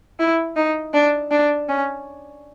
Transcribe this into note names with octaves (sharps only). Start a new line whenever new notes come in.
E4
D#4
D4
D4
C#4